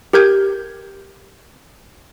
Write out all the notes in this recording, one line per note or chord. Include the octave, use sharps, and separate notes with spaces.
G4 A#4 G6 G#6